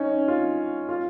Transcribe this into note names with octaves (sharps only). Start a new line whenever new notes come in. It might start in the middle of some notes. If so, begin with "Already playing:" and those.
Already playing: C#4 D#4
F4
F4